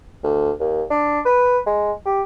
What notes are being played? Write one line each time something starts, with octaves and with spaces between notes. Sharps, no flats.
D2
D#2
D4
B4
G#3
G4